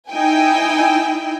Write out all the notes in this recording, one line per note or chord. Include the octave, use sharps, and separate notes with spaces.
D#4 E4 G5 G#5